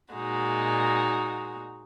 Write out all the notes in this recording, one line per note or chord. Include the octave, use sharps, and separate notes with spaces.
A#2 G#3 D#4 F#4